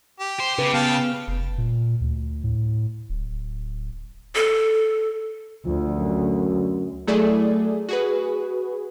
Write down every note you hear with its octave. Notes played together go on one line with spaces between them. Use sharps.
G4
C5
C#3 B4
B3 F5 G5 A5
F1
A#2
D2
A2
D1
A4
D2 F3
F#2
F#3 A3 E4 G#4 A4 D5
F#4 G#4 B4